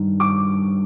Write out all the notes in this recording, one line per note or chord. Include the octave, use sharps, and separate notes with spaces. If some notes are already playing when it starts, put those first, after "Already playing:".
Already playing: G2 D#3
D6